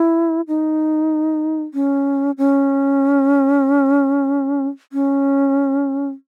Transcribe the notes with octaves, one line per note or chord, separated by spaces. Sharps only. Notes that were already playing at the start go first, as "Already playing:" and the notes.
Already playing: E4
D#4
C#4
C#4
C#4